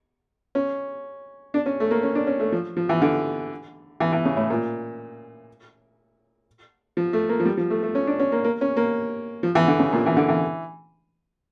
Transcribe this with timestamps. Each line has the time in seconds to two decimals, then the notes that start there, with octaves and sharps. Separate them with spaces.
0.55 C#4
1.54 D4
1.66 C#4
1.80 A3
1.91 A#3
2.03 C#4
2.15 D4
2.27 C#4
2.40 A3
2.52 F3
2.77 F3
2.89 E3
3.02 D3
4.00 E3
4.13 E3
4.25 C#3
4.37 A2
4.50 A#2
6.97 F3
7.13 A3
7.29 A#3
7.40 F3
7.45 G3
7.57 F3
7.70 A3
7.83 A3
7.95 C#4
8.07 D4
8.19 C#4
8.32 A#3
8.44 A#3
8.61 C#4
8.77 A#3
9.43 F3
9.55 E3
9.68 D3
9.80 C#3
9.93 A#2
10.06 E3
10.17 D3
10.29 E3